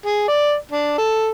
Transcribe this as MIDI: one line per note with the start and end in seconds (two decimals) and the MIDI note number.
0.06 0.25 68
0.28 0.54 74
0.71 0.93 62
0.98 1.30 69